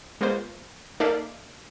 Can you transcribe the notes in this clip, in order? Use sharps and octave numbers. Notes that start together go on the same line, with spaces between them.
G#3 A#3 B3 F4 C5
A#3 D#4 A4 D5 E5 F5